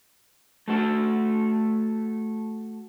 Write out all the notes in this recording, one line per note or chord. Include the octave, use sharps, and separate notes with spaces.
A3 F#4 A4